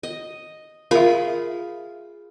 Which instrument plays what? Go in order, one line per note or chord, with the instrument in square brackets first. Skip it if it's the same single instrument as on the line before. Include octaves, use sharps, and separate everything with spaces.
[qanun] D#5
[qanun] F4 G#4 B5 [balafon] A#4 E5